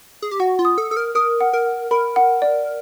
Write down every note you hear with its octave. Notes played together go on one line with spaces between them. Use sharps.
G#4
G4
F#4 F#5
F4
D#6
A4
A4 D#6
A#4
A#4 D#6
F#5
A#4
F#5
A#4 B5
F#5
D5